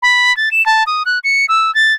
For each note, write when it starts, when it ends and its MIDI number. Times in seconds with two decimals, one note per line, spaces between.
0.02 0.35 83
0.37 0.49 93
0.51 0.64 100
0.66 0.83 81
0.87 1.03 87
1.06 1.19 90
1.24 1.46 97
1.49 1.73 88
1.75 1.94 93